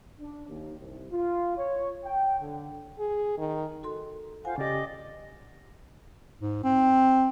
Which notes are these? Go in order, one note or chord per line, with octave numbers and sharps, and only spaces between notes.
D4
D#2
C2
F4
C#5
G5
D3
G#4
D#3
F#4 A4 C6
F4 C5 F5 F#5 G#5
C#3 G4 D5 D#5 D6
G#2
C4